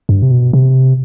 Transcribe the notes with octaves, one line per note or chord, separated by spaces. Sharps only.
G2
C3
B2
C3